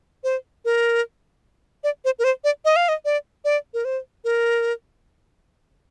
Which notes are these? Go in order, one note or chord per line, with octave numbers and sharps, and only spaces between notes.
C5
A#4
D5
C5
A#4
C5
D5
D#5
F5
D#5
D5
D5
A#4
C5
A#4